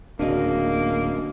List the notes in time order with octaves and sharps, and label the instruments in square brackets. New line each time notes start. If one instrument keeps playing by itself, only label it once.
[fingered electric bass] D1 C#3 [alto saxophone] A#3 [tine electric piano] D4 F#4 D#5